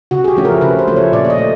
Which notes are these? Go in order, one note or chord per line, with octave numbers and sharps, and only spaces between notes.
C#3 F#4
G#4
G4
F3 A3 C#4
A#4
C#3 B4
C5
F3 A3 C#4
C#5
A#2 D5
D5
D#5
A3